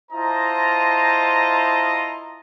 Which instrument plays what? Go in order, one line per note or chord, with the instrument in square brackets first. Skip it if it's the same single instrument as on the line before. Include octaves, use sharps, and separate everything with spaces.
[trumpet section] E4 F4 C5 D#5 A5 A#5